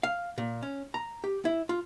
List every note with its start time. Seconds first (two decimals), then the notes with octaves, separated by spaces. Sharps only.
0.03 F5
0.38 A#2
0.63 C#4
0.94 A#5
1.24 G4
1.45 E4
1.69 F4